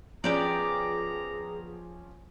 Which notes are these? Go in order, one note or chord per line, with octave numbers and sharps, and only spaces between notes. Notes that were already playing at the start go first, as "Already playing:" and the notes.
F3 B3 C#4 G4 G#4 D5 A#5